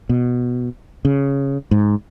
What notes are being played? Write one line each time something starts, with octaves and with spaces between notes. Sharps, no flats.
B2
C#3
G#2